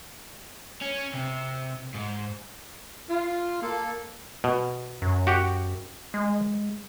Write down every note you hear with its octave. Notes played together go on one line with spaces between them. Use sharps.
C#4
C3
G#2
F4
A#3 A4
B2
F#2
F#4 G4 F#5
G#3